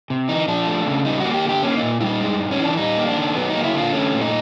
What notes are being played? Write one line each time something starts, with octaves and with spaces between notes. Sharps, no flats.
C3
E3 D#4
F3 D4
A3
C#3
G3 D#4
A#3 F#4
G4
D3 G4
A#3 C#4
D#4
A#2
G3 E4
D#4
G#3
G2
C#4
E3 D4
G3 D#4
A#3
D4
D#3
F#3 B3
A#3 D#4
E4
D3 F4
A3 C#4
A#2
D#4